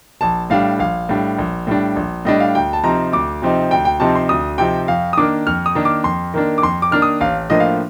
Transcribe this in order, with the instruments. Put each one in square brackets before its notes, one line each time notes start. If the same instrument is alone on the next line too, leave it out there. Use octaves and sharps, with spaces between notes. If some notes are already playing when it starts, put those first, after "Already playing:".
[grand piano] A#1 A5
A2 G3 D4 F5
A#1 F5
A2 G3 D4
A#1
A2 G3 D4
A#1
A2 G3 D4 D#5
F5
D2 G5
A5
C3 F3 C4 D#4 A#5
D2 D6
C3 F3 C4 D#4
D2 G5
G5
C3 F3 C4 D#4 A5
C6
D2 D#6
C3 F3 C4 D#4 G5
F2 F5
D#6
D#3 A#3 D4 D6
F2 F6
D#6
D#3 A#3 D4
D6
F2 C6
D#3 A#3 D4
D6
F2 C6
D6
D#3 A#3 D4 F6
D#6
A1 F5
A2 F3 A#3 D4 D#5
F5